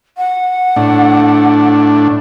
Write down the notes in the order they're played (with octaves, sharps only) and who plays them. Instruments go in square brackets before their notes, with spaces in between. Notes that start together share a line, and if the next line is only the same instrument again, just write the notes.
[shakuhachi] F#5
[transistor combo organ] A2 D4